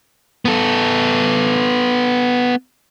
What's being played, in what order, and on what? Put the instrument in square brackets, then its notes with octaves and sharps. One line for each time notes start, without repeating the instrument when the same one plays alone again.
[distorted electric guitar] B3 A4